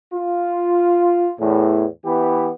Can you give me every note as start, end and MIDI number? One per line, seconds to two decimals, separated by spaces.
0.13 1.30 65
1.40 1.85 40
1.40 1.85 45
2.05 2.51 52
2.05 2.51 59
2.05 2.51 64
2.05 2.51 67